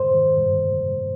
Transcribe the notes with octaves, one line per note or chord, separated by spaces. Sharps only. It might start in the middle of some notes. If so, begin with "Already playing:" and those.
Already playing: G#2 C5
D#3
G2